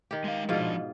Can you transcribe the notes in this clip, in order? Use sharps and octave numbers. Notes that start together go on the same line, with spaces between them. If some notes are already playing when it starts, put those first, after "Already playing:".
D#3 G4
G#3 F5
G#2 B2 F3 D4 F4